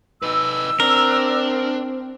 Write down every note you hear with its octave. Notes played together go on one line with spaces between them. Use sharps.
D#4 B4 E6
C4 D4 A#4